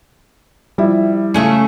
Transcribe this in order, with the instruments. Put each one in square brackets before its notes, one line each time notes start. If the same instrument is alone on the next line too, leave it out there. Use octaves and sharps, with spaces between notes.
[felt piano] F3 E4 E5 [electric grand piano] G3
[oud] C#3 A3 C#4